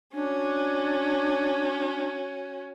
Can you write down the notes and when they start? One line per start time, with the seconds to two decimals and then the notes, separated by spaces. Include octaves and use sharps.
0.14 C#4 D4 F#4